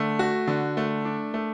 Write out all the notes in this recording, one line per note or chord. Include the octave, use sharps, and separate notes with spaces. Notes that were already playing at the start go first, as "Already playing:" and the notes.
Already playing: D3 A3
F#4
D3
A3
D4
A3